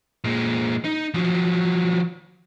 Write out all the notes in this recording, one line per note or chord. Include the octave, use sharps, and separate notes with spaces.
A#2 G#3
D#4
F3 F#3